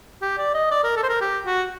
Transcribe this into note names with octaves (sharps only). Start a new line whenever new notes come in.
G4
D5
D#5
D5
A#4
A4
C5
A#4
G4
F#4